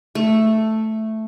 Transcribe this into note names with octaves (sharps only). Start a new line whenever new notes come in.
A3